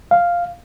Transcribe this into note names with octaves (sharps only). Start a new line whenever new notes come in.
F5